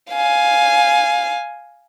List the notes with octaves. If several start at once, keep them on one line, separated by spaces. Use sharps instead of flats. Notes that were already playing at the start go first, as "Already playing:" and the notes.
F5 G#5